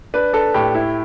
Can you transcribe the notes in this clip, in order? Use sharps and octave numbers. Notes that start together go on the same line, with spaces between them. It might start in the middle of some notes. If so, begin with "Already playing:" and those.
D4 B4
D4 A4
A2 G4
E4